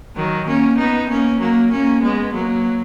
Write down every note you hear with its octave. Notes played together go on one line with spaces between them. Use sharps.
D#3 F#3
A#3 C#4
B3 D#4
A#3 C#4
F#3 A#3
A#3 C#4
G#3 B3
F#3 A#3